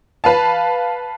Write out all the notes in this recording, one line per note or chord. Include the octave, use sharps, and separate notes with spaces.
B4 F5 A5